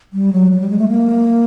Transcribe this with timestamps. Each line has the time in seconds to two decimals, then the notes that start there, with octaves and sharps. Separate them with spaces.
0.13 G3
0.33 F#3
0.52 F#3
0.60 G3
0.70 G#3
0.79 A3
0.89 A#3